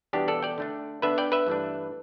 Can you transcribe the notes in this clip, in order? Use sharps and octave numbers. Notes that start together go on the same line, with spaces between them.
E2 B2 G3 B3 D4 G4
A4 D5
D5 G5
D3 A3 D4
D3 B3 D4 B4 E5
D5 G5
B4 E5
G2 E3 A3 D4